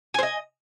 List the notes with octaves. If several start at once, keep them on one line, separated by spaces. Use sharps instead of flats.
C5 D#5 G#5